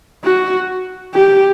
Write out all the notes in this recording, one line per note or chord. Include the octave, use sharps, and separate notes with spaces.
F#4
G4